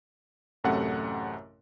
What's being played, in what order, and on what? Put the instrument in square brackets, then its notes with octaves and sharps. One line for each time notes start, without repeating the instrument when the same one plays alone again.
[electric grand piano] A1 F#2 C3 A3 F#5